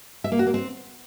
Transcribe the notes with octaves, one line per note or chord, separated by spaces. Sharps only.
E5
A#3
F#4
A#3
C4